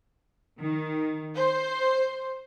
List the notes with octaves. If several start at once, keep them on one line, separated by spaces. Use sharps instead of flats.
D#3
C5